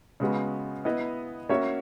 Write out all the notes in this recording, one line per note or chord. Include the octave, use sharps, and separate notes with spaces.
C#3 G#3 B3 F#4
B3 E4 B4 D#5
A#3 C#4 F#4 C#5 E5